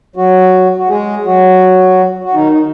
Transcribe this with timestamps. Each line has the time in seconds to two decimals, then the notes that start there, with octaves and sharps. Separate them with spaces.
0.16 F#3 F#4
0.78 F#4
0.89 G#3 G#4
1.25 F#3 F#4
2.24 F#4
2.34 D#3 D#4
2.52 D#4